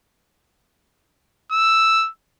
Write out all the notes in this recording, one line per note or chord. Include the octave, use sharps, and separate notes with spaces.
E6